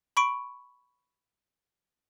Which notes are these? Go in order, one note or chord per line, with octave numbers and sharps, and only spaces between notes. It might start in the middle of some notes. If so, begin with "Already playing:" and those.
B5 C#6 D7